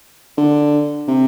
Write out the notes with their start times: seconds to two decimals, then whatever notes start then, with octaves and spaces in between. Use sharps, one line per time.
0.38 D3
1.08 C3